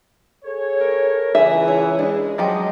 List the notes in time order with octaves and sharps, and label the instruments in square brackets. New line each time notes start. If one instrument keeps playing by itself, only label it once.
[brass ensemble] G#4 A4 C#5
[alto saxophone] A#4
[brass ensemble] C#2 E3 [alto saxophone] G#4 [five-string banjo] E5
[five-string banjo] C#5
[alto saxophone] G#3 [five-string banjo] D4
[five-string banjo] F3 F#3 G4 [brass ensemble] D#5